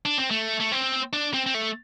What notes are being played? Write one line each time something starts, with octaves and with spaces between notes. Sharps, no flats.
D4
C4
A3
A3
C4
D4
C4
C4
A3